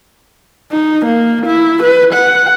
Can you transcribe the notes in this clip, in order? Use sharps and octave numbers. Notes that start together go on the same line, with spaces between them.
D#4
A#3
E4
B4
F#5